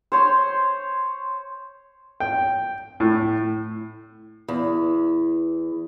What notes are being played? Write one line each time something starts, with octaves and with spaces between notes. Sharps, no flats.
C5 C#5 C6
G5
A2
E2